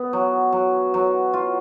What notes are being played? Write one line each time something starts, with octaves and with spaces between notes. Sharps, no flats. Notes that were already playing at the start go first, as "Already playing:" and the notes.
Already playing: B3
F#3
F#3
F#3
F4